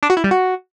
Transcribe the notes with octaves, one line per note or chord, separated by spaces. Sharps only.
D4
F#4
E4
G3
F#4